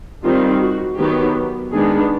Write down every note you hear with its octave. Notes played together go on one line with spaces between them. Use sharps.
D#3 G3 C4 F4
F#4
D#3 F#3 B3 G4
D#3 G#3 B3 D4 G#4